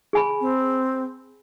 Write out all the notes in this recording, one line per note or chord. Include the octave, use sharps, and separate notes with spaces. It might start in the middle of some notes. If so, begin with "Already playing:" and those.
G#4 G#5 B5
C4